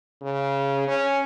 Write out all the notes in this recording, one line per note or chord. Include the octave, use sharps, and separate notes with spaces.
C#3
C#4